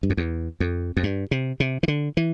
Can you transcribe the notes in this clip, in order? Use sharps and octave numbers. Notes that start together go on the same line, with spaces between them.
G2
F2
E2
F2
F2
G2
C3
C3
E3
D3
E3